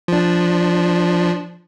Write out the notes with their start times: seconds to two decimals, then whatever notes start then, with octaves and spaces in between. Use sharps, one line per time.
0.08 F3 D4